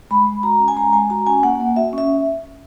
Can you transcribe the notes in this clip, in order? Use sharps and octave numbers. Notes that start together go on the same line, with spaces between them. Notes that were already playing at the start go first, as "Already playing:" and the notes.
G#3 B5
G#3
F#4 A#5
C#4
G#5
G#3 A#5
G#3 G#5
F#4 A#5
C#4 G#5
A#3 F#5
A#3
F#4 E5
C#4 E5